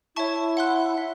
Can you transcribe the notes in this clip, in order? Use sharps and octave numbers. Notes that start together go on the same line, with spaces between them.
E4 C#5 E5 A5 C#6
F#5 C6 F#6
E4 E5